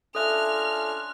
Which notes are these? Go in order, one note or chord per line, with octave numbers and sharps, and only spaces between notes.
C#4 D4 F4 A4 E5 D#6 F6 F#6